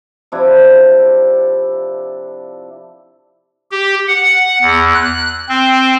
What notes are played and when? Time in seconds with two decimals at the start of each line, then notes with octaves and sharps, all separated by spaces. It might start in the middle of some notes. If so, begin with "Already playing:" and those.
0.32 C3 F3 D4 E4
3.71 G4
4.08 F#5
4.62 E2
4.94 F#6
5.49 C4